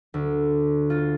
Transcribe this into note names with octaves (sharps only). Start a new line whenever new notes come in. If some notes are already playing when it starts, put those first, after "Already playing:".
D2
F4